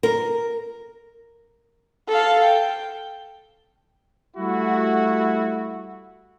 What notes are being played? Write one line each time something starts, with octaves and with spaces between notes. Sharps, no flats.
A#4
A4 F5
G5
G3 A3 E4 F#4